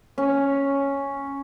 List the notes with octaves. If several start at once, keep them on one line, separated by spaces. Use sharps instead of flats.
C#4